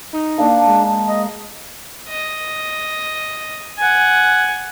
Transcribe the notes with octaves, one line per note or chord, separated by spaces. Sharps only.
D#4
A#3 D4 A5
G#3
D#5
D#5
F#5 G#5